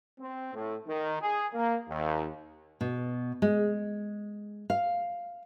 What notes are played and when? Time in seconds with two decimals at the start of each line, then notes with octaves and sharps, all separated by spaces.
0.19 C4
0.54 A2
0.87 D#3
1.21 G#4
1.53 A#3
1.89 D#2
2.81 B2
3.42 G#3
4.70 F5